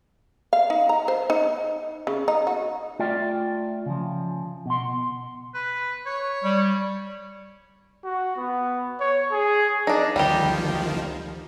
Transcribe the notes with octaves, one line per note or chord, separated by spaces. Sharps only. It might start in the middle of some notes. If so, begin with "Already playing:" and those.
F5
D#4
A#5
C5
D#4
C#3
D#4
F#4
A3 F4 D5 E5 G5
C#3 F3
B2 C6
B4
C#5
G3
F#4
B3
C#5
G#4
D4 D#4
D2 D#3 F3 G3 G4